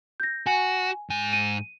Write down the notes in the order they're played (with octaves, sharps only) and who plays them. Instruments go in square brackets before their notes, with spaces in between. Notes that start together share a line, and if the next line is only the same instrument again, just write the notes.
[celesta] G6 A#6
[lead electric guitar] F#4 [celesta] G#5
[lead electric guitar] G#2 G#5
[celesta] D#7